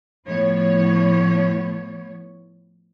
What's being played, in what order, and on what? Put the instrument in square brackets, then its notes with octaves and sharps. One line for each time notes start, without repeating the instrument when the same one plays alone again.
[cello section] A2 F3 B3 C#5